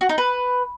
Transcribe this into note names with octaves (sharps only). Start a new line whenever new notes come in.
F#4
D#4
B4